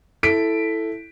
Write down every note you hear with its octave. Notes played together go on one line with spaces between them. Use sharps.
E4 A4 B6 D7